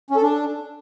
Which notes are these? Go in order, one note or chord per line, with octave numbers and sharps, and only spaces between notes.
C#4
A4
D4